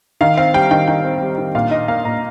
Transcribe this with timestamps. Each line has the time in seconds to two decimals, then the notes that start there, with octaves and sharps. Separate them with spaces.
0.21 D#3 F5
0.37 C4 F5
0.54 G3 G5
0.71 D#3 G5
0.88 D#3 G5
1.04 C4
1.21 G3
1.38 D#3
1.55 A#2 F5
1.71 D#4 D#5
1.88 A#3 F5
2.05 A#2 A#5